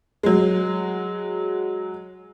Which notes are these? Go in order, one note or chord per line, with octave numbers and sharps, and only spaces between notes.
F#3 G#3